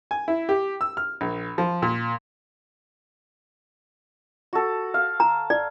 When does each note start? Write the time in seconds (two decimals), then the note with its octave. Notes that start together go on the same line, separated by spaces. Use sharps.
0.11 G#5
0.28 E4
0.49 G4
0.81 E6
0.97 F6
1.21 A#1
1.58 F3
1.82 A#2
4.53 F#4 A4
4.94 F5
5.20 A#5
5.50 D5